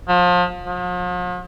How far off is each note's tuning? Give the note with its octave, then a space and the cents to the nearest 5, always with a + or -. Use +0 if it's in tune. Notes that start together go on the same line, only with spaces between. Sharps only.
F3 +30
F3 +45